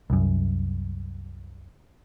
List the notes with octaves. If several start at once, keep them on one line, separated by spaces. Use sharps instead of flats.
C2 F#2